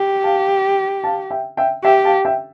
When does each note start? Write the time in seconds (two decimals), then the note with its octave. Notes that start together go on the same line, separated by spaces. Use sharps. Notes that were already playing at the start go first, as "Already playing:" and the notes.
Already playing: G4
0.24 F5 A5
1.04 F5 A5
1.31 E5 G5
1.57 E5 G5
1.84 G4 E5 G5
2.04 F5 A5
2.25 E5 G5